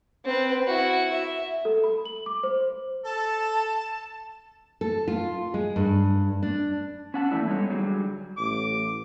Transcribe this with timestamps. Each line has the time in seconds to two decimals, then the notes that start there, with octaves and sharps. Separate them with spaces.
0.24 C4 B4
0.66 E4 F#4
1.12 E5
1.65 A4
1.84 B5
2.05 F#7
2.26 D6
2.43 C5
3.05 A4 A5
4.81 A4
5.08 F4
5.54 G#3
5.76 G2
6.43 D4
7.14 C#4 F#5 A5
7.31 E3 A3 A#3 C#4 D4 E4
7.47 G3 G#3 B3 D#4 A4 C#5
7.70 D3 F#3 G3 G#4
8.38 A1 D6